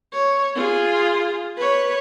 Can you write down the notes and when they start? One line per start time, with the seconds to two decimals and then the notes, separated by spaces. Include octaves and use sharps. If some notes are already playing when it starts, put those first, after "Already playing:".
0.12 C#5
0.55 F4 G#4
1.57 B4 C#5